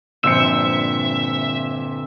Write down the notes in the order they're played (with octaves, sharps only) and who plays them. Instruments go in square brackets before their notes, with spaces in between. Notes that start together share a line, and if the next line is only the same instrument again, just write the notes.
[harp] G1 C4 [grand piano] A#2 F3 C#7 [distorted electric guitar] E5 [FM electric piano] E6